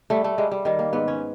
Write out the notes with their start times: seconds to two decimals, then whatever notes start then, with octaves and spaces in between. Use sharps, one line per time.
0.10 G3 A3
0.24 A3
0.38 G3 G#3
0.52 G3
0.65 D#3 G3
0.79 A#3
0.93 G#2 B3
1.08 C#4